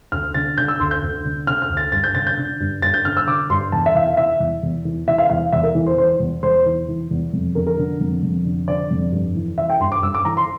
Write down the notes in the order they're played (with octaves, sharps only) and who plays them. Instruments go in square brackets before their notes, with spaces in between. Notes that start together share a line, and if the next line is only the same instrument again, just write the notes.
[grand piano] D2 F6
D3 A6
D3 G6
E6
D2 C6
G6
D2
D3
D3 F6
F6
D2
A6
G2 A6
G6
D3 A6
G6
D3
G2
G2 A6
G6
D3 F6
E6
D3 D6
G2 C6
E2 A5
E5
E3 F5
F5
E3 E5
E2
E2
E3
E3 E5
F5
E2 F5
E2 E5
A#4
E3
C5
E3 C5
E2
E2 C5
E3
E3
E2
F2
D3 A#4
A#4
D3
F2
F2
D3
D3 D5
F2
G2
E3
E3 E5
G5
G2 C6
D6
G2 E6
D6
E3 A#5
C6